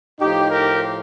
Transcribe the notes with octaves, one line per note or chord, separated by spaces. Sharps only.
A2 F3 D#4 G4
G4 A#4